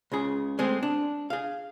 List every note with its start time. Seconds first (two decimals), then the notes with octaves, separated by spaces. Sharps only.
0.12 C#2 C#3 G#4
0.59 G#3 A3 C4 G#4
0.83 D4
1.30 G#4 F5